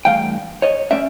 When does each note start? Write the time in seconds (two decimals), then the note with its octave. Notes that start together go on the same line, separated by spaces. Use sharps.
0.05 G2 E3 A3 F5 G5
0.62 C#5 D#5
0.91 A3 C#4 D5 E5